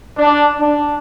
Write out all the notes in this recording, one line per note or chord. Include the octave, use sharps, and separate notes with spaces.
D4
D4